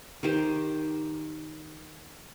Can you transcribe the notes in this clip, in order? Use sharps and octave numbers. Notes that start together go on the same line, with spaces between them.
D#3 G4 C5